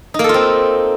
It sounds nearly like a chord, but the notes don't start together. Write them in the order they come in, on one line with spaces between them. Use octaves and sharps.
D#4 A#3 A4 F4 C4